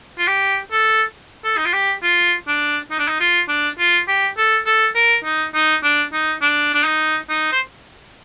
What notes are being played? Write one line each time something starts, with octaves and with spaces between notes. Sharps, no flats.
F4
G4
A4
A4
D#4
F4
G4
F4
D4
D#4
D4
D#4
F4
D4
F4
G4
A4
A4
A#4
D#4
D#4
D4
D#4
D4
D4
D#4
D#4
C5